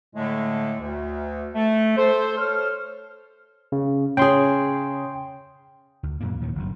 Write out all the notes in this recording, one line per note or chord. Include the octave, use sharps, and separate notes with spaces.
A2 D3 G#3 A3
D2
A3
A4 C5
A4 C5 C#5 F6
C#3
C#3 G#4 G5 C6
D2
F#2 A#2 D3 A#3
E2 A#2 D#3 F#3
F#1 G2